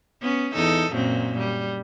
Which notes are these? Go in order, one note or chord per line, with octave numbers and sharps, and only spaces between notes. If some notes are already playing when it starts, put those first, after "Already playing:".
B3 C#4
E2 D#4 A4
F#2 A#2 C4
G3